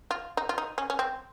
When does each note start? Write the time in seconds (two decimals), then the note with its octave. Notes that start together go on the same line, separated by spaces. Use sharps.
0.11 F4
0.37 D#4
0.49 F4
0.58 D#4
0.78 C#4
0.90 C#4
0.99 C4